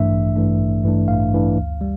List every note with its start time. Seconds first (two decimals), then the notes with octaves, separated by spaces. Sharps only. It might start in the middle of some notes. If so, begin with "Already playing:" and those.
Already playing: A1 G2 E3 A3 D4 E5
0.11 A1
0.36 G2 E3 A3 D4
0.60 A1
0.84 G2 E3 A3 D4
1.08 A1 F5
1.33 G2 E3 A3 D4
1.57 D2
1.81 G3